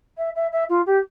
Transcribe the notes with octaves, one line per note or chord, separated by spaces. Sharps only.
E5
E5
E5
F4
G4